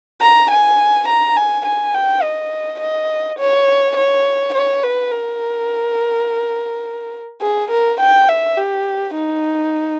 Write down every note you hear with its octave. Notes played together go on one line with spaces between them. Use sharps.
A#5
G#5
A#5
G#5
G#5
G5
D#5
D#5
C#5
C#5
C#5
B4
A#4
G#4
A#4
G5
E5
G4
D#4